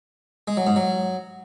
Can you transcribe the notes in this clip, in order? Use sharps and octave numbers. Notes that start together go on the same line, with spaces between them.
G#3
F#3
G#2
F#3